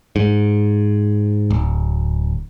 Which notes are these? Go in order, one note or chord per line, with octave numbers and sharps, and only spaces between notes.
G#2
D1